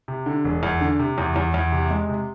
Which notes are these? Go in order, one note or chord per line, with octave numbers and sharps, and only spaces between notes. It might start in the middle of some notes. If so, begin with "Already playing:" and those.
C3
D3
E1
E2
D3
C3
E2
E2
E2
C3
G#3
C3